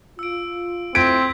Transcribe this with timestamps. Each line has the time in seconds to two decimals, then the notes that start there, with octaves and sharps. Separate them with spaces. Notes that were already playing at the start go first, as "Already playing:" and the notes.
0.19 F4 E6 D7
0.95 A3 C4 E4 F4 G6 G#6 B6 D7